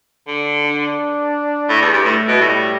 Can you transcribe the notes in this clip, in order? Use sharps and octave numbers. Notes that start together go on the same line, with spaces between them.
D3
D4
A2
E2
G2
A2 A3
B2
A2 G3